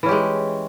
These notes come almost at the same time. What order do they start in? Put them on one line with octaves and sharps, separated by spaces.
E3 C#4 G4 G#3